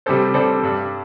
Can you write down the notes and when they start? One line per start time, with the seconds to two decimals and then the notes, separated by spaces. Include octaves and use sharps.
0.06 C3 G3 D4 A4 C5
0.34 C3 G3 D4 A4 C5
0.63 G2 G3 D4